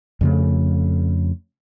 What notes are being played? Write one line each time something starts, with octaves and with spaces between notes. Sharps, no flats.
F2 C#3 A3